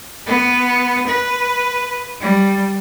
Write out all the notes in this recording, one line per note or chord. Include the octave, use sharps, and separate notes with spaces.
B3
B4
G3